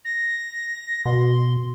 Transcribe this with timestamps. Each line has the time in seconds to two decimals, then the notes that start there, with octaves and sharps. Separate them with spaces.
0.05 A#6
1.06 B2 C6